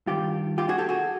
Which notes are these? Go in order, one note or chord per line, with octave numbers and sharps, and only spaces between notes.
G2 D#3 G3 F4 G4
F4 G4
F#4 G#4
G4 A4
F#4 G#4